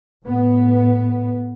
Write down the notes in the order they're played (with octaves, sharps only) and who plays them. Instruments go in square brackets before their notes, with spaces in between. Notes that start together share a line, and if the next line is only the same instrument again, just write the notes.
[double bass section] A2 B3